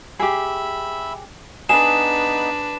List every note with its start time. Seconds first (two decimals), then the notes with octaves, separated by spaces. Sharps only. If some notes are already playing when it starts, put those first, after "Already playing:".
0.19 G4 G#4 E5 B5
1.69 B3 D4 D#4 G#4 B4 B5 E7